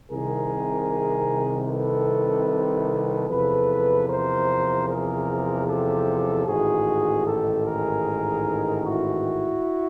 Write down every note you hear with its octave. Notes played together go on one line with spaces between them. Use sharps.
C2 C3 D#3 G#4 A#4
A4 B4
E2 C3 F3 A4 B4
A#4 C5
G#4 A#4
G4 A4
A1 G#2 D#3 F#4 G#4
G4 A4
G#4 A#4
E4 F#4